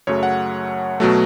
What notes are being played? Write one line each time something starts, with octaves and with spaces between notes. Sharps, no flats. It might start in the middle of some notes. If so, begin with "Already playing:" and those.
F#2 C#3 F#3 A3 C#5
F#5
B2 F#3 A3